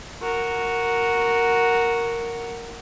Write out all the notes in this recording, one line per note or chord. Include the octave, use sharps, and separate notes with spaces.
F#4 A#4